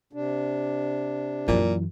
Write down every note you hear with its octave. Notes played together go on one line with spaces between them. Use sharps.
C3 D4
F#2 A#2 E3